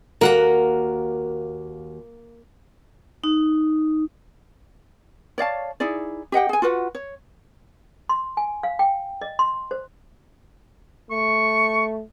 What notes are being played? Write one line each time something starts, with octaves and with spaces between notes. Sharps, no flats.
D#2 A#3 F#4 A#4 F#5 A#5
D#4
C#5 D5 F5 A5
D#4 E4 G#4 D5
G4 D#5 F#5 G5
G#4 G#5
F4 F#4 B4 F#5
C#5
C6
G#5
F5
G5
D#5
C6
C5
A3 C#6